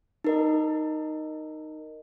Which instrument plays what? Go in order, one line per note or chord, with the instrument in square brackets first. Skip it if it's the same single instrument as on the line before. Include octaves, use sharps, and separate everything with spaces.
[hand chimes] D#4 A#4 D#5